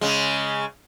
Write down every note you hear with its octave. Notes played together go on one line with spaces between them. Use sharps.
C#3 G#3